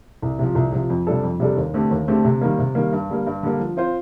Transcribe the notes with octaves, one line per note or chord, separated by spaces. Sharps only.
C2
C3 F3
C2
C3 F3
F2
C3 G3 D4 A4
F2
C3 G3 D4 A4
D#2
D3 A3 C4 G4
D#2
D3 A3 C4 G4
C3
D#3 G3 A#3
C3
D#3 G3 A#3
G2
D3 G3 A#3
G2
D3 G3 A#3
F3
C4 F4 C5